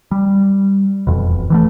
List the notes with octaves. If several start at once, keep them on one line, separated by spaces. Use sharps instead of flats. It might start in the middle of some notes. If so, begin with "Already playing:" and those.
G3
E1 F2 B2
E3 F#3 A3